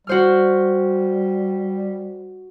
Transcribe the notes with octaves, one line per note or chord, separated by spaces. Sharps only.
G3 F#4 C5 F6